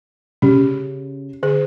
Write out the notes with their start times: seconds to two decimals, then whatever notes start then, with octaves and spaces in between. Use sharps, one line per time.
0.42 C#3 C#4 G4
1.43 D3 G#4